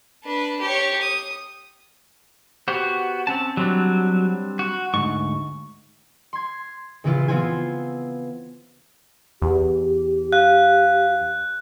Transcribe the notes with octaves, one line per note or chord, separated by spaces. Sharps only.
D4 B4
G4 C#5
D#6
B3 F#4 G4 C5
C4 C#4 A5
F#3 G3 C4 D4
F#4
D2 G#2 C#6
C6 G#6
A#1 C#3 E3 E4 F4
B3 C4 E4 F4 C5 G#5
E2 G4
F5 F#6